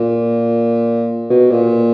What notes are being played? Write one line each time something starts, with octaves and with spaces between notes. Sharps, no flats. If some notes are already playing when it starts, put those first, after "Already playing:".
Already playing: A#2
B2
A#2